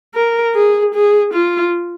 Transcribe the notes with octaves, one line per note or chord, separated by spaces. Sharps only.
A#4
G#4
G#4
F4